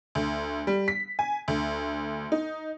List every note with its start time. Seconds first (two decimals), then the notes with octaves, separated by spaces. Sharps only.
0.15 D2
0.67 G3
0.88 B6
1.19 G#5
1.48 D2
2.32 D#4